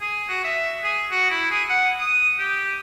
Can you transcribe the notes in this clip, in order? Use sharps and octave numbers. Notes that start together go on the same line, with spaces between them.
G#4
F#4
E5
G#4
F#4
E4
G#4
F#5
D#6
G4